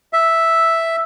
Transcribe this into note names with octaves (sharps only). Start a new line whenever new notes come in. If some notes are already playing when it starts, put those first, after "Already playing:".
E5